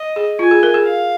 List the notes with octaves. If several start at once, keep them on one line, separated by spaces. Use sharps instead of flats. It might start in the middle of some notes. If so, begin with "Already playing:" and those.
Already playing: D#5
G#4
F4 G#5
G#4
A#4
G#4
F5